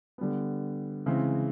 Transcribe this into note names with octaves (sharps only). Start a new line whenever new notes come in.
D3 G3 B3
C#3 E3 G#3 C4